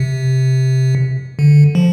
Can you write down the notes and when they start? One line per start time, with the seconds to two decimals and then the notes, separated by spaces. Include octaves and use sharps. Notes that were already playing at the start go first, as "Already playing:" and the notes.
Already playing: C3
1.39 D3
1.75 F3